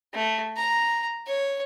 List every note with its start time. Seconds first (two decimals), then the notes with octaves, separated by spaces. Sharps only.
0.14 A3
0.56 A#5
1.27 C#5